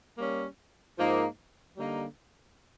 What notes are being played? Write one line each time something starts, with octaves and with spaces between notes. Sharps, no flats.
G3 A#3 C#4
G#2 F3 A#3 D#4
D3 G3 A#3 D#4